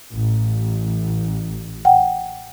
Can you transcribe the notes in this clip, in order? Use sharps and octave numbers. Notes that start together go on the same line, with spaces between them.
A1
F#5 G5